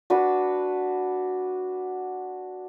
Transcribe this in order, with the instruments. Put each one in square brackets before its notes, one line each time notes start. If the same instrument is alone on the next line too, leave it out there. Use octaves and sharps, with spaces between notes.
[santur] D4 F#4 B4